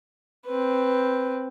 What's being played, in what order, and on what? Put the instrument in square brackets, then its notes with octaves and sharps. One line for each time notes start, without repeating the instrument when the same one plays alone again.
[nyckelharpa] C4 B4